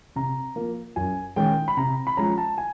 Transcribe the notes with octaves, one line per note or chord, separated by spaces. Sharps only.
C3 A#5
F3 A#3
F#2 G#5
D#3 G#3 C#4 G5
B5
C3 A#5
B5
F3 G#3 C#4 A#5
A5
G#5